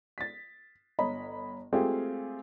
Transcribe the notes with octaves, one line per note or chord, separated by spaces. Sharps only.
A6 B6
G1 C#5 D#5 A#5 B5
G#3 A3 C4 F4 G4 G#4